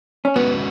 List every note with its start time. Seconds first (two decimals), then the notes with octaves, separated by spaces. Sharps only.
0.25 C#4
0.36 G#3 B3 C#4 F#4 B4